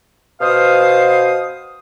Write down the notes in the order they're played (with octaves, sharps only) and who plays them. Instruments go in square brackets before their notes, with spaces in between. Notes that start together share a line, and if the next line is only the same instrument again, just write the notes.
[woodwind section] B2 C5 F5 D#6